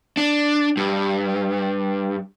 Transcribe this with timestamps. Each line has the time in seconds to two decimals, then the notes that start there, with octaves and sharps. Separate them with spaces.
0.17 D4
0.77 G2